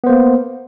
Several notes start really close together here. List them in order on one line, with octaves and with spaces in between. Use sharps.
B3 C5 A#3